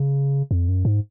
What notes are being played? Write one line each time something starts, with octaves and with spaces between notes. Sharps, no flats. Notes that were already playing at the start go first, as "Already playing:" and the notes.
Already playing: C#3
F2
F#2
G#2